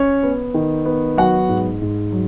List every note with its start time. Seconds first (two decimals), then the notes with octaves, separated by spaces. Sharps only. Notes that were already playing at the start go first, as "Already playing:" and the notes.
Already playing: C#4 C#5
0.23 B3
0.54 D#3
0.86 B3
1.17 F#3 F#4 F#5
1.49 G#2
1.82 G#2
2.12 F#3